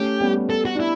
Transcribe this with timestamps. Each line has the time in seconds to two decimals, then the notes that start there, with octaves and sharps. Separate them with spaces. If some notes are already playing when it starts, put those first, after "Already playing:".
Already playing: A3 C#4 G4
0.20 G3 B3
0.50 A4
0.65 F#4
0.75 D4
0.80 E4